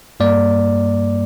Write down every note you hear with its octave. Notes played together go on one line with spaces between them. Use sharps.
G2 G3 A#3 D5